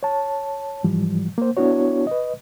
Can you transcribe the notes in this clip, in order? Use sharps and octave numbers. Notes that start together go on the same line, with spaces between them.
C#5 A5
G#2 E3 F3 G3
A#3 C5
B3 D4 E4 F#4 C#5
B4 D#5